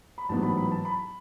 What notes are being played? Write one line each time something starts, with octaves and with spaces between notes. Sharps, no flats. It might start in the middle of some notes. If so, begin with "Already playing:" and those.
B5
A1 G#2 F#3 B3 A5
B5
B5
A5
B5